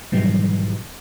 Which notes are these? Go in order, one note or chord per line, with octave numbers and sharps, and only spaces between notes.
G#2 B2 D#3 E3 F#3 G3